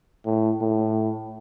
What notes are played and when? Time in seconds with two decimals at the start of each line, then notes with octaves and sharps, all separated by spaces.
0.26 A2
0.61 A2